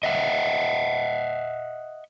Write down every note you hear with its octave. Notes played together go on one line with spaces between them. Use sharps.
D#5 E5 F#5